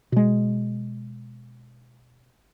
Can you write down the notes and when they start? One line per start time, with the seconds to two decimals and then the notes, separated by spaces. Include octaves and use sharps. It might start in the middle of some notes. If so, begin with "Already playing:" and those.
0.12 B2 G#3